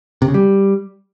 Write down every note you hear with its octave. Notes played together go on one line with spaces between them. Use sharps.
C3
C#3
G3